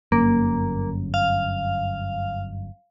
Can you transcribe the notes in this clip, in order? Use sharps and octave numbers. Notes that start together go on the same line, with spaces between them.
G1 F#2 A#3
F5